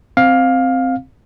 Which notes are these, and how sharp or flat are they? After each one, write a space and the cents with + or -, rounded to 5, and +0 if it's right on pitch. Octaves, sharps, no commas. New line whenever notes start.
C4 +0 F5 +15